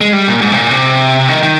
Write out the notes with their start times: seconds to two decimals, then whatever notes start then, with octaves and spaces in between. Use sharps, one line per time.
0.01 G#3
0.13 G3
0.28 A#2
0.41 G#2
0.52 C3
0.56 A#2
0.71 C3
1.29 D#3
1.43 D#3